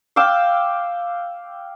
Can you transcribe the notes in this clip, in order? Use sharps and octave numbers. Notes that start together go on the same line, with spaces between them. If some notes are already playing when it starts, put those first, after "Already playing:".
F5 G5 D6 E6